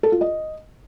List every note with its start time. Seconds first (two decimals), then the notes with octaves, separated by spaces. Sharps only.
0.03 A4
0.12 F4
0.21 D#5